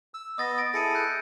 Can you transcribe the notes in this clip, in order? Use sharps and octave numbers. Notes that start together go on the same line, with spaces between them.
E6
B3 D#5 D#6 A6 A#6
A6 A#6 D7
E4 G#4 A4 A#6 C#7 D#7
F#6 G6 C#7